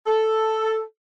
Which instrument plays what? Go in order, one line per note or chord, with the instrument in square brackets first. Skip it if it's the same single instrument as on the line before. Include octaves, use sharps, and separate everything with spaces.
[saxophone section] A4